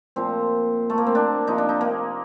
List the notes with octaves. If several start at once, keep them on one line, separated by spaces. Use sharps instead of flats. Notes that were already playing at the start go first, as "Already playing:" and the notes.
A#2 F3 C4
A3
A#3
C4
D4
C3 F3 D#4
D4
D#4
A#3